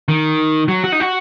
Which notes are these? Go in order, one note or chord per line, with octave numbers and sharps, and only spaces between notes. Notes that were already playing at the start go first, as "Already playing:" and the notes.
D#3
F#3
F#4
D#4
F#4